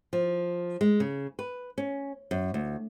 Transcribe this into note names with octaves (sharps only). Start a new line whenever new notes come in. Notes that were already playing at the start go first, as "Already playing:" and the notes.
F3
G#3
C#3
B4
C#4
F#2
D2